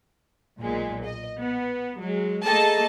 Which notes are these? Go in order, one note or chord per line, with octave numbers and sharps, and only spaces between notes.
B1 A#2 G#3
D#5
B3
F#3 G#3
A3 A#3 G#4 A4 D#5 A5